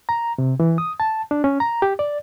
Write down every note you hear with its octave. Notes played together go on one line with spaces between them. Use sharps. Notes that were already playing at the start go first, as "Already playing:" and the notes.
A#5
C3
E3
D#6
A5
D4
C#4
A#5
G4
D5